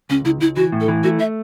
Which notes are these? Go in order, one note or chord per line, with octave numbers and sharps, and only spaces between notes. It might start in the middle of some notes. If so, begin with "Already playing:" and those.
C#2 C#4
C#2 E4
C#2 E4
E3 F#4
A2
A4
E3
A3 F#4
E5